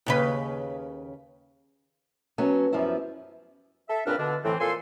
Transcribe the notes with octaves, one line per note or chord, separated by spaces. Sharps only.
D#2 C#3 B4
F#3 B3 C#4 A4
F#2 F3 G3 B3 E4
A4 E5
C#2 A#2 C4 D4 B4 F6
B2 D3 D4
A2 E3 C4
F2 A#2 A4 G#5 C6